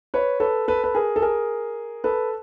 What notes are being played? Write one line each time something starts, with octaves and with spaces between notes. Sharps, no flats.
B4 C#5
A4 B4
A4 B4
B4
G#4 A#4
A4
G#4 A#4
A4 B4